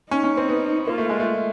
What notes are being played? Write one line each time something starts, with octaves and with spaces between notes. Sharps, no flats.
C#4 D#4
C#4
C4
B3
A#3 F4
A3
G#3
A3